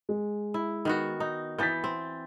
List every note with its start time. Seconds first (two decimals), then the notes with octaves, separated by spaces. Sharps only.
0.09 G#3
0.54 E4
0.85 D#3 B3 F#4
1.20 D#4
1.59 E3 B3 G6 A6 B6
1.84 C4